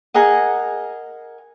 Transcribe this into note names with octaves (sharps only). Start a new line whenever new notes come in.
G#4 A#4 D#5 F#5